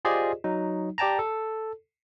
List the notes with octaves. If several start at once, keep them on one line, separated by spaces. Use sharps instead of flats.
F4 G4 G#4 C5 D5 D#5
F#3 D#4
G4 D5 G5 A5 A#5
A4